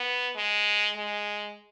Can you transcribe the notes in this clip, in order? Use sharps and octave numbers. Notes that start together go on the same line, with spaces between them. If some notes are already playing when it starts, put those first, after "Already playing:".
Already playing: B3
G#3
G#3